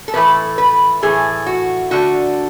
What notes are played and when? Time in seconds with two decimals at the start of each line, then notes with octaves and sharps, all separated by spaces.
0.08 A4
0.14 A2 E3 A3 B4
0.58 B4
1.02 A2 E3 A3 G#4
1.46 F#4
1.91 D3 A3 F#4